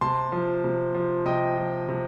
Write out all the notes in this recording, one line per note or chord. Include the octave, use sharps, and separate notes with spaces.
C3 A5 C6
F3
C3
F3
C3 D#5 G5
F3
C3